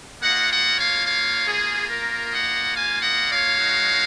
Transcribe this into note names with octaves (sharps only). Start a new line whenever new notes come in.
A#3 F4 D#5 F#5
D#5 F#5
C#5 F5
C#5 F5
G#4
A#4
D#5 F#5
F5 G#5
D#5 F#5
C#5 F5
G#3 D#4 F#4